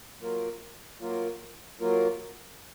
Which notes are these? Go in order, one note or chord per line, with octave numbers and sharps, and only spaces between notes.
F#3 A#3 F4 A#4
F#3 A#3 F4 A#4
F#3 A#3 F4 A#4